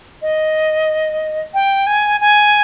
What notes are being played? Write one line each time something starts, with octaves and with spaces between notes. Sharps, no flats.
D#5
G5
G#5
G#5